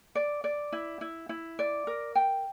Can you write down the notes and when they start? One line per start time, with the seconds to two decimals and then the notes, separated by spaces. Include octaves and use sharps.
0.15 D5
0.44 D5
0.72 E4
1.01 E4
1.29 E4
1.59 D5
1.87 A#4
2.15 G5